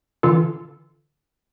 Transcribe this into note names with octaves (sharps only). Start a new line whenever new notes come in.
D3 E3 F4 A4